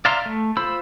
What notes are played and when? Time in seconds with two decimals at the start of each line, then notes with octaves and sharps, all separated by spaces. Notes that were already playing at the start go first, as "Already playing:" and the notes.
0.05 D5 E5 F5 A#5 C6
0.26 A3
0.57 F4 C5 B5 E6